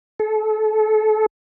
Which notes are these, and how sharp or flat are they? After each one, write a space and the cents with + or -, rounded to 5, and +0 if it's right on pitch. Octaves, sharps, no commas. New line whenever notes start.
A4 -30